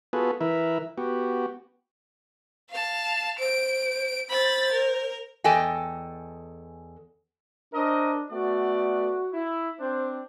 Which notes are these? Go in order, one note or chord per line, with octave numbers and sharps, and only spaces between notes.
B3 F4 F#4 G#4 A4 B4
E3 E4 A#4 B4 E5
B3 F#4 G4
F5 A5
C5 D7
C5 B5 A6
A#4
E2 A4 D#5 G5 G#5
D4 A#4 C5 D#5
A3 B3 F#4 D5
E4
C4 D4 C5